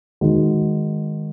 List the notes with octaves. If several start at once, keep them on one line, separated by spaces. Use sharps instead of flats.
D#3 G#3 F#4